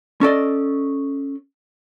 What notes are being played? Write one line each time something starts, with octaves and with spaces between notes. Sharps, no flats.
C#4 A4 D5 D#5